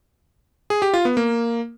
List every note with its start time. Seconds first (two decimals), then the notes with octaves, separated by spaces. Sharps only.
0.70 G#4
0.82 G4
0.94 F4
1.05 B3
1.17 A#3